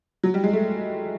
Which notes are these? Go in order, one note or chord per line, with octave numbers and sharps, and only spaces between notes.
F#3
G3
G#3
A3